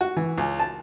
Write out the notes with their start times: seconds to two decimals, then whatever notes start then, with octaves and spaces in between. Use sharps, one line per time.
0.01 F#4
0.17 E3
0.38 C#2
0.60 A5